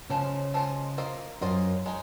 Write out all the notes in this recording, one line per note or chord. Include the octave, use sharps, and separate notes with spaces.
C#3 F3 G#3 C5
F3 G#3 C5
A#3 F4 C5 D#5
F#2 A#3 F4 C5 D#5
G#3 D#4